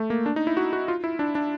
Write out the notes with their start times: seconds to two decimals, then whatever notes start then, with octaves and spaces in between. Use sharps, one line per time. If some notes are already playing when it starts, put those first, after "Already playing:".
Already playing: A3
0.10 A#3
0.26 D4
0.36 D#4
0.47 E4
0.57 F#4
0.73 F#4
0.88 F4
1.04 E4
1.19 D4
1.35 D4